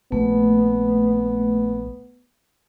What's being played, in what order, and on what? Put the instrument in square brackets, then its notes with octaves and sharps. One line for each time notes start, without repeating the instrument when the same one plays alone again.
[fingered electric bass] A#1 [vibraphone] A3 [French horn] B3